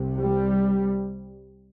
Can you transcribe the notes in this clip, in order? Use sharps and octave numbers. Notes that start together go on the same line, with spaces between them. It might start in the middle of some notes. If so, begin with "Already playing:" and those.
Already playing: C2 C3
G3